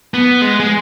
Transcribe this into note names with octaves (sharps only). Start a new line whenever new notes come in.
B3
G#3
G#3